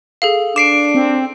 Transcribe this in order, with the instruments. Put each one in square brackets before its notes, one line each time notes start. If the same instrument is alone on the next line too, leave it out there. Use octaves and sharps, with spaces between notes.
[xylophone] G#4 A4 F5
[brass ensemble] D4 [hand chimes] D6 C7 D7 [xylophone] E7
[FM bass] C4